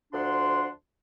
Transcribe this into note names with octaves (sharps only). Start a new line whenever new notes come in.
D2 F3 D4 F#5 C6